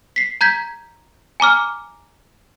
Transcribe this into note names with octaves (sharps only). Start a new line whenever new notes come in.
B6 C7
A#5 G6 G#6 B6
G#5 A#5 D6 F6